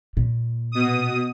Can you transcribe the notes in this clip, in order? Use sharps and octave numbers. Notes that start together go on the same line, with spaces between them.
A#2
B2 D#6